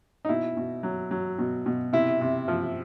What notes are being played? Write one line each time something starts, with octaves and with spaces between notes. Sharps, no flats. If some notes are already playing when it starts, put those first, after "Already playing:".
D#4
B2 E4
B2
F#3
F#3
B2
B2
C3 E4
C3
F3